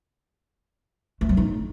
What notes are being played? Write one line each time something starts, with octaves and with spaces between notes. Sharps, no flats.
A3
F#3
D#4